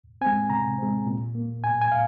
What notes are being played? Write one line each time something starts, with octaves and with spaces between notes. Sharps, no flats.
G#3 C4 G#5
C3 A#5
G#3 C4
A#2
A#3
A#2 G#5
G#5
F5